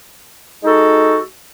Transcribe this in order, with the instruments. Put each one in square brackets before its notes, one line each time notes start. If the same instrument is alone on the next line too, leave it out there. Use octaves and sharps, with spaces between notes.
[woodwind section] G#3 D#4 F#4 A4